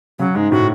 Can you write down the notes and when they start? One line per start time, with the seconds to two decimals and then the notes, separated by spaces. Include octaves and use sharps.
0.19 C#3 F#3
0.35 G#2 G#3
0.52 A2 F#4